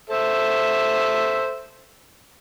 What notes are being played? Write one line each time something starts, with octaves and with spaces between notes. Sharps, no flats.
A4 C5 E5